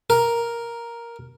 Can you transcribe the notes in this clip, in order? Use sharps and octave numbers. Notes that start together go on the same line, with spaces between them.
A#4